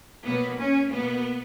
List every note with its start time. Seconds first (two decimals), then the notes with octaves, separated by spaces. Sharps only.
0.24 B2 F#3 A#3 B3
0.58 C#4
0.91 B2 A#3 B3